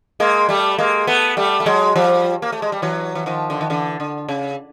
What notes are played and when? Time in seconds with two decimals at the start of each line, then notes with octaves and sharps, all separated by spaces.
0.20 G#3 A#3
0.49 G3 A3
0.78 G#3 A#3
1.07 A3 B3
1.37 G3 A3
1.60 A3
1.66 F#3 G#3
1.96 F3 G3
2.42 A#3
2.52 A3
2.62 G#3
2.72 G3
2.82 E3 F#3
3.15 E3
3.26 D#3 F3
3.50 D3
3.61 D#3
3.70 D3 E3
4.00 D3
4.29 C#3